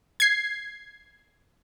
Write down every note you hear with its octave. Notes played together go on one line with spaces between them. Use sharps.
G#6 C7